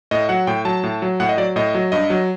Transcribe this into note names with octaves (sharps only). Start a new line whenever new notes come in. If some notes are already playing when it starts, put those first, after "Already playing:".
A2 D#5
F#3 F#5
A2 G5
F#3 A5
A2
F#3
A2 F#5
D#5
F#3 D5
A2 D#5
F#3
G2 D#5
F#3